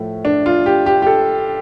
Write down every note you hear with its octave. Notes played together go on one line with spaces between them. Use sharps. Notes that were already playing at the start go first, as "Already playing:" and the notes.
Already playing: A2 F3 A3
D4
F4
G4
G4
G4
A4